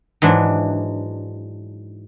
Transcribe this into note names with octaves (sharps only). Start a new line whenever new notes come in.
G#2 E3 F#3 D4